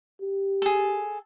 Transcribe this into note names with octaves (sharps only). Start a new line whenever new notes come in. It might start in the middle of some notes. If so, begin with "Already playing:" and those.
G4
G#4 A4